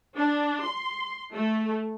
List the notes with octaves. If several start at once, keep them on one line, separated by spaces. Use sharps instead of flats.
D4
C6
A3